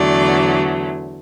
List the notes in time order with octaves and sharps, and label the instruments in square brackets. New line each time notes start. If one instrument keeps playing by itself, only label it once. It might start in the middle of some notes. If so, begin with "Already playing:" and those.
Already playing: [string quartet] E2 D3 F#3 A3 D5